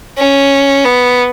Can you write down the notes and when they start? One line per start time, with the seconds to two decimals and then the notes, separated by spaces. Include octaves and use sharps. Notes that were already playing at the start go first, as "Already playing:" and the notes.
0.18 C#4
0.85 B3